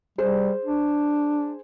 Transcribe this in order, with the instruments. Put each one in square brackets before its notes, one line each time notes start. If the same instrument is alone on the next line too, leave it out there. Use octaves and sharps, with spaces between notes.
[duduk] G3 [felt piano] G#4 C5
[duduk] D4